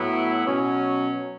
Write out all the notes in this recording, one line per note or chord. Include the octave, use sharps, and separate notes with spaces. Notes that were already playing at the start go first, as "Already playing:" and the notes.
Already playing: A2 F#3 B3 E4
B2 F#3 C#4